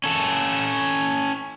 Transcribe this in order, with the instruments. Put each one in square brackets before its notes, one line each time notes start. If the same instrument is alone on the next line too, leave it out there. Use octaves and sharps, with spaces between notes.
[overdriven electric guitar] C#4 A4